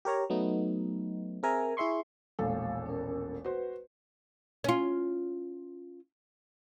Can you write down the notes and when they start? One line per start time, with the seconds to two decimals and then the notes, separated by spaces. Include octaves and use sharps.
0.05 G4 A#4 C#5 A#5
0.30 F#3 A3 B3 D#4
1.43 C4 G#4 A#4 E5 G#5 A#5
1.77 E4 G#4 E5 C6 C#6
2.39 E1 A#1 G#3 A4 F5
2.86 C#4 A#4
3.45 F#4 B4 C5
4.64 C#4 F4